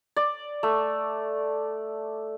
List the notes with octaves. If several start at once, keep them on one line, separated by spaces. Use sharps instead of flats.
D5
A3